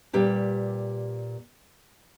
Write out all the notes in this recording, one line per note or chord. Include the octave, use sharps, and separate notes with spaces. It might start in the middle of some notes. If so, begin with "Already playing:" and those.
A#2 G3 G4 B4